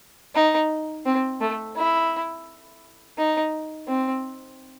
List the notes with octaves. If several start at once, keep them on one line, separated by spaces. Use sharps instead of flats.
D#4
C4
A3
E4
D#4
C4